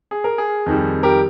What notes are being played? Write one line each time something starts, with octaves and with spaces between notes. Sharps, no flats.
G#4
A#4
G#4
F2 D#3 G3
G4 A#4